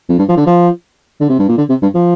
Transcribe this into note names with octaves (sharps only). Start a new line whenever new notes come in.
F2
G2
F3
D3
F3
D3
C3
G2
A#2
D3
C3
G2
F3